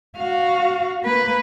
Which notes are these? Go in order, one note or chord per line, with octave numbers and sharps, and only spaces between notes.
F#4 F5
A#3 B4